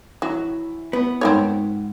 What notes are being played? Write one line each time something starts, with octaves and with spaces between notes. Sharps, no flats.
E3 F#3 E4
B3
G#2 C4 D#4 F4 A#4 C#5 F#5 B5